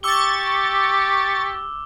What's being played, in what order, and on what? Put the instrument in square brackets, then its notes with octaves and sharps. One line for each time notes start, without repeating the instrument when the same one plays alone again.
[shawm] G4 [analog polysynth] C#6 A6 [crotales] D6 E6 G7